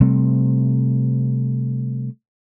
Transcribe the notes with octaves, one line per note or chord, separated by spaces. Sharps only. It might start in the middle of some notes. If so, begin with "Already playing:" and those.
C3 G3 A3 C4